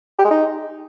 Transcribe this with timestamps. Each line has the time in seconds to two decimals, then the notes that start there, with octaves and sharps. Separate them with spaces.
0.19 G4
0.25 G#3
0.31 D#4